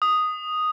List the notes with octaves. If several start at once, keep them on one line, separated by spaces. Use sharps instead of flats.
D#6